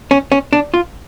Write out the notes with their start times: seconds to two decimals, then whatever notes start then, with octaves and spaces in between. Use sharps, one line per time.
0.11 C#4
0.32 C#4
0.53 D4
0.74 F4